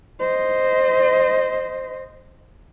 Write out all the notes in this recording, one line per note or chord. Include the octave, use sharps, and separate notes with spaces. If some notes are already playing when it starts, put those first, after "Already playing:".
C5 D#5